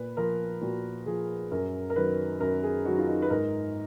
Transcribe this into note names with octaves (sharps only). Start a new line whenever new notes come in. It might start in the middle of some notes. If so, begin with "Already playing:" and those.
Already playing: A#2 B4
F3 A#4
A#2 F#4
F3 G#4
F#2 A#4
A#4
D#3 F#3 B4
F#2 A#4
G#4
D#3 F#3 F#4
F4
D#4
B4
G#2 A#4